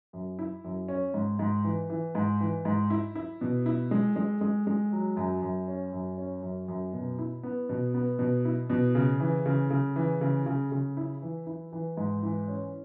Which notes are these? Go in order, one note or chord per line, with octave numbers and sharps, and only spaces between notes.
F#2
E4
F#2
C#4
G#2
G#2
E3
E3
G#2
E3
G#2
E4
E4
B2
E4
G#3
G#3
G#3
G#3
F#3
F#2
F#2
C#4
F#2
C#4
F#2
F#2
B2
E4
B3
B2
B3
B2
E4
B2
C#3
E3
C#3
C#3
E3
C#3
C#3
C#3
E4
E3
E4
E3
G#2
E3
C#4